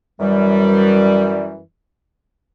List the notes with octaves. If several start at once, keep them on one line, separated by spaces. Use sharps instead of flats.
F#2 E3 G3